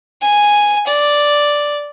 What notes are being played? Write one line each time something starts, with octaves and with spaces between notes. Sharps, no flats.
G#5
D5